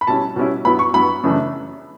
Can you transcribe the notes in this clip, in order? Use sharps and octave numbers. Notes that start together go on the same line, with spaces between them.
B5
B2 G3 C#4 E4 A5
B2 G3 C#4 E4
G2 F#3 B3 E4 B5
C#6
G2 F#3 B3 E4 B5
F#2 C#3 E3 A3 D4